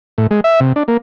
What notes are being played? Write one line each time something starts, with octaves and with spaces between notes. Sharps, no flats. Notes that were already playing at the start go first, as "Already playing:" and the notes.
A2
G#3
E5
C3
D4
A#3